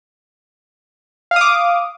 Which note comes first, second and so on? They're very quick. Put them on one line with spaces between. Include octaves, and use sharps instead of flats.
F5 D#6 D6